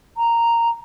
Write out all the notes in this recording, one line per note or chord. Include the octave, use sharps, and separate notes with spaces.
A#5